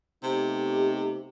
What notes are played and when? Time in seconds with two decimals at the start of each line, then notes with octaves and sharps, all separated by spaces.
0.23 C3 A3 B3 D#4 G4